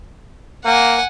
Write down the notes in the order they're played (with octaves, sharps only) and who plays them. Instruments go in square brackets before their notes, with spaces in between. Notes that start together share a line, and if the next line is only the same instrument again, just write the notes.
[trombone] A#3 [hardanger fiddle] F#5 G#5